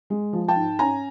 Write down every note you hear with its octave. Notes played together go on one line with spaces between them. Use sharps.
G#3
F3
G5 A5
G#2
C#4 G#5 A#5